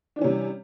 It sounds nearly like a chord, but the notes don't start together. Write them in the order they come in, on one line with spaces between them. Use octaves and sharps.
D4 E3 C#4 C3 G3